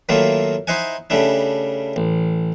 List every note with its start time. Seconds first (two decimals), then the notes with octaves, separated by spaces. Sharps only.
0.09 D#3 F#3 A3 A#3 E4 F4
0.67 D#4 E4 C5 D#5 F#5 G#5
1.10 C#3 G3 A3 D4 E4
1.96 A1